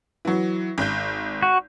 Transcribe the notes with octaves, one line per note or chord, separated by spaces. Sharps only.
E3 F#3
G#1 G6
F#4